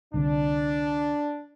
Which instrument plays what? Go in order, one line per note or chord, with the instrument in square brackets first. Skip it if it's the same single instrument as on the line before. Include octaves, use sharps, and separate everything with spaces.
[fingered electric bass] C2 D3 [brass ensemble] D4